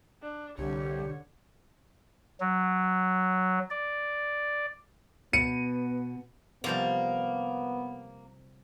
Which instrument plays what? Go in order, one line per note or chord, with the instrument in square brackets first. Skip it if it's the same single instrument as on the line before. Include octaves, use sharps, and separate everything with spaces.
[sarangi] D4
[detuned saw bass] C2 [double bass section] D3 [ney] G4 [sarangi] C#5
[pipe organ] F#3
D5
[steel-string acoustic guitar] B2 [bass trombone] B3 [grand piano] C#7 D#7
[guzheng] C3 F3 G3 [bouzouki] A#3 [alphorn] B3